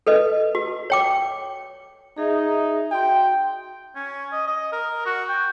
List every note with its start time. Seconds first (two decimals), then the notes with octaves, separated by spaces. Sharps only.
0.07 A4 B4 D#5
0.55 F#4
0.90 C#5 G5 D6
2.18 D#4 G#4 E5
2.91 F#4 G5 C6
3.95 C#4
4.32 D#5
4.47 D#5
4.72 A#4
5.06 F#4
5.29 G5